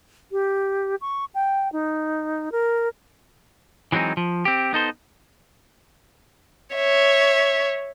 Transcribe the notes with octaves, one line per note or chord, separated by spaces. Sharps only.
G4
C#6
G5
D#4
A#4
E3 F#3 G#3 C4 D#4
F3
C4 G4
B3 D#4 A4 C5
C#5 E5